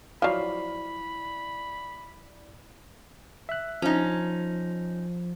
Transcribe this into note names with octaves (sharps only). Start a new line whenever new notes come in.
F3 F#3 E4 D5 F5 B5
E5 F#6
F3 C#4 D#4